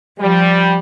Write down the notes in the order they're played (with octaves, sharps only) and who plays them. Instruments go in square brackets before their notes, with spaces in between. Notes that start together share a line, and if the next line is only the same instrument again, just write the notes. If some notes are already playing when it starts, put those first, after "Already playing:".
[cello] F3 [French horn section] G3